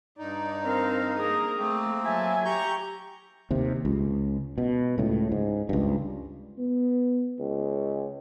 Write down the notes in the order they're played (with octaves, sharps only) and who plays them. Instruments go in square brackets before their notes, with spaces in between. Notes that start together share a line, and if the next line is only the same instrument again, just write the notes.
[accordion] G2 D#4 [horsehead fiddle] D5
[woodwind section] C4 A#4 [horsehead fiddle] C5 F5
[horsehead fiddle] A#3 A#4 [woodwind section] G#4 D#6
[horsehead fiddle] A3 [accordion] A#3 C4
[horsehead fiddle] F#3 A4 [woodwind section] E5 G#5
[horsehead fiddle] G4 [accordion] A#5 C#6 G6
[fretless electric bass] D#2 C3
C#2
B2
C#2 A2
G#2
C#2 G2
[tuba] B3
C#2